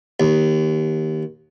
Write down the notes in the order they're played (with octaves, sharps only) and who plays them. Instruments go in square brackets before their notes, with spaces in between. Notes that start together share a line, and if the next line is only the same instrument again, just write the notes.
[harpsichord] D#2